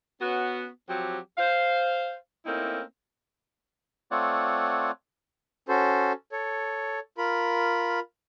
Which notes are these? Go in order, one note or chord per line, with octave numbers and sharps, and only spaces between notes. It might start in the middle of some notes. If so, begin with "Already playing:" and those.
B3 C#4 F#4
F3 F#3 C4 G4
C5 F5
A3 A#3 C4 C#4 D#4 E4
A3 C4 F4 C#5 D5 F#5
C#4 F#4 A4 C5
A4 C#5
F4 A#4 B5